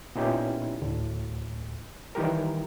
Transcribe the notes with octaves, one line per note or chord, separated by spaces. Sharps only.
A#2 B3 C#4 D#4 E4 G4
D2 A2
D#3 E3 G3 G4 A#4